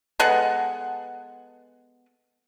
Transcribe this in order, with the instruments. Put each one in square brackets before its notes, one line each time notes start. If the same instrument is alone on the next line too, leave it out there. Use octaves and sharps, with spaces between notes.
[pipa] G#3 B3 A4 F#5